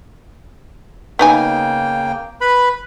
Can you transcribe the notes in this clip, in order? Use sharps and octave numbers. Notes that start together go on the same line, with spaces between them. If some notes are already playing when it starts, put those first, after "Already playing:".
C#3 A#3 B3 D#4 G5 G#5
B4 B5